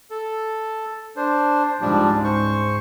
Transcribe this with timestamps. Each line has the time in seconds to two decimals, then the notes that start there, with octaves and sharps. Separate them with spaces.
0.11 A4
1.17 D4 C5
1.81 C#2 G#2 F3 G3 D4
2.24 C5 C#6